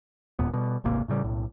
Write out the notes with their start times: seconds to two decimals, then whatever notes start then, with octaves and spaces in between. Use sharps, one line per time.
0.39 E1 D#2 A#2 B3
0.54 B2 G3
0.84 D1 G#1 C3 A#3
1.08 A2 C#3 G3
1.24 B1 A2